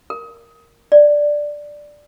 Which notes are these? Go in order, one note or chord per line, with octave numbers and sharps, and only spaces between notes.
A#4
D5